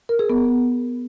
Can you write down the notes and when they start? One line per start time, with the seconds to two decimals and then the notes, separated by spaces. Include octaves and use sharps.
0.09 A#4
0.19 G#4
0.30 B3